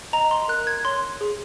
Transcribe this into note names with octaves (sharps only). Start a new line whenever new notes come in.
D#5 A#5
C6
A#4 F#6
G#6
C#5 C6
G#4